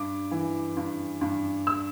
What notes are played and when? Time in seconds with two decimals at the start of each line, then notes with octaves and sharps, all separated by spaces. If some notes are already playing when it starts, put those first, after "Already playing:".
Already playing: G2 D6
0.31 E3
0.77 G2
1.21 G2
1.67 E6